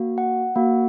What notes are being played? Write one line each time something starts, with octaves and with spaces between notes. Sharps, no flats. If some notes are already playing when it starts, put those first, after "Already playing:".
Already playing: A#3 F#4
F#5
A#3 F#4